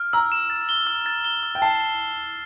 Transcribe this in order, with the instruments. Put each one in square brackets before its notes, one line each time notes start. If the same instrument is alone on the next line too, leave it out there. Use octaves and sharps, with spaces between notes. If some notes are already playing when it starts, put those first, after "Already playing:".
Already playing: [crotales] F6
[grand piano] A#5 [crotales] E6
[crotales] E7
A6
G7
E6
A6
G7
E6
[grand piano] G5
[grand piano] A5 [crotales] C7